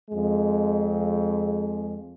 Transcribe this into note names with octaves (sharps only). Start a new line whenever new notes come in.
F2 G#3